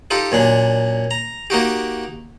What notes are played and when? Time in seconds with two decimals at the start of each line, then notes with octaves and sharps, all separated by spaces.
0.11 D#4 F4 G4 A4
0.32 F#2 A#2 D4
1.11 A#5
1.50 A#3 D#4 F#4 G4